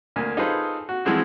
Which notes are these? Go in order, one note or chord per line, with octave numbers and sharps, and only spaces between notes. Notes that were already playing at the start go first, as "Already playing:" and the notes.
D2 A#3 G#5
D#4 F4 G#4 A4 B4 C5
F#4
E3 F3 G#3 C4 F#4